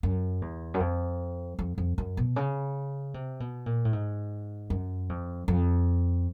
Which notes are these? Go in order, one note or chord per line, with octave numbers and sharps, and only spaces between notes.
F#2
E2
F#2
F2
F2
F2
F#2
B2
C#3
C3
B2
A#2
A2
G#2
F#2
F2
F2